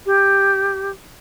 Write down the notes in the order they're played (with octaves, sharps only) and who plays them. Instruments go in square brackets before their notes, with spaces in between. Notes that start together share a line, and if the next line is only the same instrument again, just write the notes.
[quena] G4